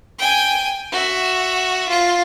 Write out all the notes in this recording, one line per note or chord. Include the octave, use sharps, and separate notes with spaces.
G5 G#5
F#4 E5
F4